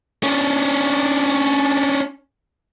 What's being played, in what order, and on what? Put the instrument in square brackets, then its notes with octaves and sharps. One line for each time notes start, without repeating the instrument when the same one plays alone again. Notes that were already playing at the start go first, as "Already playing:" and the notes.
[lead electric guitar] C#4 D4